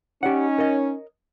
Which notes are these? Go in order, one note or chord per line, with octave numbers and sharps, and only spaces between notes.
C#4 D#4 G4 D5 F#5
A#4 C#5 D#5